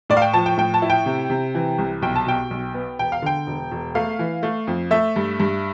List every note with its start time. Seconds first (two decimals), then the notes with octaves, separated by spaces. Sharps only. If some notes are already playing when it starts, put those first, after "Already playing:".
0.10 A2 D5
0.17 F5
0.22 G5
0.33 F3 A5
0.46 G5
0.57 A2 G5
0.74 A5
0.82 E4
0.90 G5
1.06 C3
1.30 C3
1.55 E3
1.78 C2
2.02 B1 G5
2.16 A5
2.27 B2 G5
2.51 B1
2.74 B3
2.99 E1 G5
3.12 F5
3.22 D3 G5
3.47 E1
3.71 E1
3.95 A3 F5
4.19 E3
4.43 A3
4.67 F2
4.91 A3 E5
5.16 G2
5.40 G2